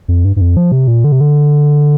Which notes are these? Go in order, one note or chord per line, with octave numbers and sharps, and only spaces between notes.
F2
G2
G2
F2
F3
C3
A#2
D3
C3
D3